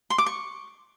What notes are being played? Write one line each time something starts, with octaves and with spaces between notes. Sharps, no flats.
C6
D6
C#6